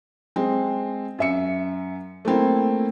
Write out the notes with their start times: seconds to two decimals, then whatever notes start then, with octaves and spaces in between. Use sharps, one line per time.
0.36 G#3 C4
1.19 F#2 E5 C#7
2.25 A3 A#3 C4 E4